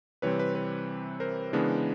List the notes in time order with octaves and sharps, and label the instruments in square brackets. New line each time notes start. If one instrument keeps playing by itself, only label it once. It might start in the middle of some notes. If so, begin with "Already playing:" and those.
[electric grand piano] C3 E3 G3 C4 B4 C#5
B4
B4
A#4 C5
C#3 E3 G#3 B3 D4